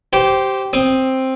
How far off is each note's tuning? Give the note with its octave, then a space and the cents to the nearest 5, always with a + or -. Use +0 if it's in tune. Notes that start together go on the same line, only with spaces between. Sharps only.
G4 -15 C5 +0
C4 +5 D#6 +0